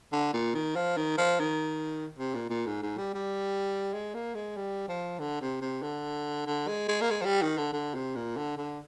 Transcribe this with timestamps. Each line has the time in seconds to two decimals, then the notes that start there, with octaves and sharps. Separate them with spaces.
0.12 D3
0.33 A#2
0.54 D#3
0.75 F3
0.97 D#3
1.18 F3
1.40 D#3
2.19 C3
2.35 A#2
2.50 A#2
2.67 G#2
2.83 G#2
2.98 G3
3.14 G3
3.94 G#3
4.14 A#3
4.35 G#3
4.57 G3
4.88 F3
5.19 D3
5.41 C3
5.61 C3
5.83 D3
6.46 D3
6.68 G#3
6.88 G#3
7.01 A#3
7.11 G#3
7.21 F3
7.25 G3
7.42 D#3
7.58 D3
7.73 D3
7.95 C3
8.16 A#2
8.37 D3
8.57 D3